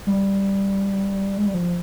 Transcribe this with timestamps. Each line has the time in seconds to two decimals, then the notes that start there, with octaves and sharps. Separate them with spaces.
0.07 G3
1.38 G#3
1.46 G3
1.54 F3